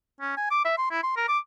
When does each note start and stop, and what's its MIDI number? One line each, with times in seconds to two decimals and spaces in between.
0.21 0.35 61
0.37 0.48 80
0.51 0.65 86
0.65 0.77 76
0.78 0.88 84
0.91 1.01 64
1.03 1.15 84
1.16 1.28 70
1.28 1.38 86